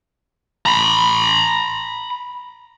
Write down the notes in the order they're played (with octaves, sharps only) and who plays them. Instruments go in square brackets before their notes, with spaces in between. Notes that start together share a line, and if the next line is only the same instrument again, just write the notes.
[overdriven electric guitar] A#5 B5